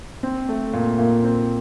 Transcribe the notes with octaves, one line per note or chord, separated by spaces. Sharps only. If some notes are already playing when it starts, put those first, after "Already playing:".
C4
A3
A#2
A#2
C4